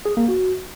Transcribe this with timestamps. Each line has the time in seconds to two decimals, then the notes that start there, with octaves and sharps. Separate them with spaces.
0.05 G#4
0.17 A#3
0.28 F#4